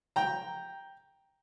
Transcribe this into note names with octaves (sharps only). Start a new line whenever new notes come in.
G5 A#5